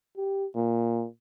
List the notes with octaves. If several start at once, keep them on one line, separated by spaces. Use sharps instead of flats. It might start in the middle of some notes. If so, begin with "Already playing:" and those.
G4
A#2